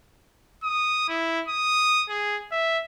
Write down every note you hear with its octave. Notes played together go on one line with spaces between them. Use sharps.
D#6
E4
D#6
G#4
E5